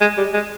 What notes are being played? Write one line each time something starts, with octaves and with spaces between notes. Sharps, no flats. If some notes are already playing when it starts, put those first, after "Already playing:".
G#3
G3
G#3